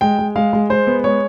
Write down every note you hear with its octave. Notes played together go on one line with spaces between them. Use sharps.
G#3 G5
G#3
G#3 F5
G#3
G#3 C5
B3
G#3 C#5